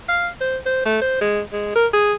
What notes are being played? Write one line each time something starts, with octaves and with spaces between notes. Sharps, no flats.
F5
C5
C5
A3
C5
G#3
G#3
A#4
G#4